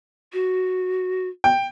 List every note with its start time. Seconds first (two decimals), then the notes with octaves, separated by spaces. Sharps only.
0.33 F#4
1.44 G5